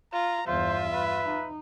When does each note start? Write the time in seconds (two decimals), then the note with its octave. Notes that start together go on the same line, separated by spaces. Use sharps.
0.13 F4 A#5
0.47 E2 G2 F4 C5 E5
0.92 G2 B4
1.25 D#4